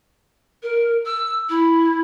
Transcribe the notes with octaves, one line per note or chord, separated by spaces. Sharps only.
A#4
E6
E4